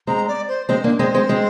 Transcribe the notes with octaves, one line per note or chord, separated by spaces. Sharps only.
G#3 C4 A#5
D5
C5
G#3 C4 C5
A#3 D4
G#3 C4 C5
G#3 C4
G#3 C4